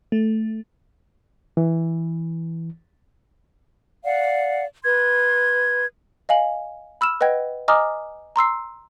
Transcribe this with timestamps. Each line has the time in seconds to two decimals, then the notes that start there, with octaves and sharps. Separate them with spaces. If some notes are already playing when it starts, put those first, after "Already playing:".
0.12 A3
1.57 E3
4.04 D5 F5 F#5
4.83 B4 C6 G#6
6.29 D#5 F5 G#5 F#7
7.01 B5 E6 F6 E7
7.21 B4 D#5 F#5 G5 G#6
7.68 D#5 G#5 A#5 D6 D#6 F6
8.36 A#5 C6 E6 C7